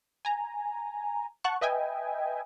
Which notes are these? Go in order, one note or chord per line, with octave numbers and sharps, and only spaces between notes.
G#5 A#5
F#5 A5 C#6 F#6
B4 D#5 E5 G5 G#5